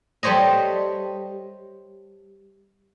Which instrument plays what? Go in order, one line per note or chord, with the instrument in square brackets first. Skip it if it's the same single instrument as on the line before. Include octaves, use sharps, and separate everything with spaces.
[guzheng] G3 A4 C5 C#5 D#5